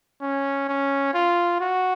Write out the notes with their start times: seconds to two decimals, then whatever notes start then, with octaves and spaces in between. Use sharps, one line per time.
0.21 C#4
0.69 C#4
1.14 F4
1.60 F#4